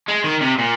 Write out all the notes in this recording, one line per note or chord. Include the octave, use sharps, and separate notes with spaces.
G#3
D#3
C3
A#2